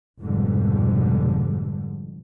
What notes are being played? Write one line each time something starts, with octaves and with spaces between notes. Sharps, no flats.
F1 F2 G#2 B2 D3 G3